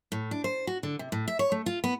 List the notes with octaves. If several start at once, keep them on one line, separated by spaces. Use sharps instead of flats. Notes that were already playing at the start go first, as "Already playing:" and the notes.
A2
D4
C5
F#4
D3
C3
A2
E5
C#5
A3
F4
B3